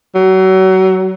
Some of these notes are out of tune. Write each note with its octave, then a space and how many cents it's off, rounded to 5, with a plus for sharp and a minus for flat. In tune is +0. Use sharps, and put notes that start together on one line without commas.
F#3 +30